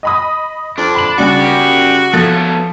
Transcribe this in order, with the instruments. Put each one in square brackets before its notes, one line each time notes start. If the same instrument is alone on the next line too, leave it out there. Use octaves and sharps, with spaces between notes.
[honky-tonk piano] D#5 B5 D#6
[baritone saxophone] F2 [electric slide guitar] D4
[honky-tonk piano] B5 F#7
[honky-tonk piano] C#3 G3 G#4 [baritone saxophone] F#4
[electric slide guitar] G4 A#4
[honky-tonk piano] F3 A4 A6 [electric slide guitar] F#3 A3 B3